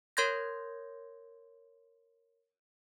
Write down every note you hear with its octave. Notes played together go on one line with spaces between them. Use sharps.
A#4 C#5 C6 G6 G#6 A#6